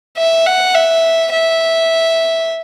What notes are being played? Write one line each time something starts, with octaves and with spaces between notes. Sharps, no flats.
E5
F#5
E5
E5